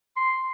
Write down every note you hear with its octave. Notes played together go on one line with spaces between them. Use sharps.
C6